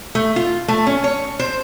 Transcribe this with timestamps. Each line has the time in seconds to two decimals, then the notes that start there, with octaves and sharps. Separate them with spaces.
0.15 A3
0.36 F4
0.68 A3
0.87 C#4
1.04 C#5
1.39 C5